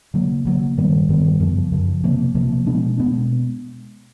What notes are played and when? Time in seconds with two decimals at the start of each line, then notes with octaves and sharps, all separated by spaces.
0.14 C#3 F#3 A#3
0.45 C#3 F#3 A#3
0.77 G2 D#3 G3 B3
1.09 G2 D#3 G3 B3
1.40 F#2 C#3 F3
1.72 F#2 C#3 F3
2.04 C3 F3 A#3
2.35 C3 F3 A#3
2.66 B2 G#3 B3 D4
2.97 B2 G#3 B3 D4